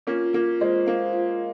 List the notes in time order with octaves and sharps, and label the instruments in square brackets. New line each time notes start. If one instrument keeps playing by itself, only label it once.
[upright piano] A#3 C#4 [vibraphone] F4
[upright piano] A#3 [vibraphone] F4
[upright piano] G#3 [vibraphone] C5
[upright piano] A#3 [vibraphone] F5
[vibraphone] F4